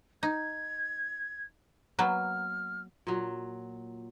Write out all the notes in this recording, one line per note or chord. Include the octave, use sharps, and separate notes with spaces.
D#4 G#6
F#3 A#3 B3 F6
A#2 F#3